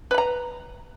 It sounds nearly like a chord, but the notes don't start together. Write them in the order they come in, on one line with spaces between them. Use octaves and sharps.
B4 B5 A#5